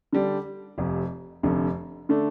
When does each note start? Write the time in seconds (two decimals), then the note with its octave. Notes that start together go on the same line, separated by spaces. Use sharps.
0.13 D3 G3 D4
0.78 F1 F2 C3
1.43 F1 F2 D3
2.09 D3 A3 D4